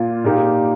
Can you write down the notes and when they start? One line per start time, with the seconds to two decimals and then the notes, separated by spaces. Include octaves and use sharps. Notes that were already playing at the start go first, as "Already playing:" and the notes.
Already playing: A#2 A#3 F4
0.24 A#2 A#3 D#4 G4